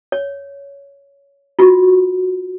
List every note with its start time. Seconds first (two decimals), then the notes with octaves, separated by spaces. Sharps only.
0.12 C#5
1.59 F4 F#4